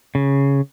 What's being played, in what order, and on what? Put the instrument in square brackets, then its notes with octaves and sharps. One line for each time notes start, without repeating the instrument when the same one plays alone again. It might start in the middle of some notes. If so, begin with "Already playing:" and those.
[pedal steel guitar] C#3